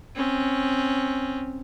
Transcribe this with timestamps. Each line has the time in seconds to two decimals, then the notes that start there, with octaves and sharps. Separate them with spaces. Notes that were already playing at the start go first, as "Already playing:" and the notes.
0.16 C4 C#4